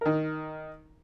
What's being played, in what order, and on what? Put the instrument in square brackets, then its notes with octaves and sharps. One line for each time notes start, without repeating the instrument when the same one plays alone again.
[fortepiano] D#3 A#4